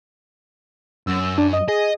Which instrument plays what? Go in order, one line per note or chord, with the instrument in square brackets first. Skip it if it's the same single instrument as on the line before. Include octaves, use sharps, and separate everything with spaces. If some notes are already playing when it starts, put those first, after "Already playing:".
[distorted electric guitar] F#2 [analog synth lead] E6
[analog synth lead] D4
D#5
[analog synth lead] G#4 [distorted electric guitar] D#5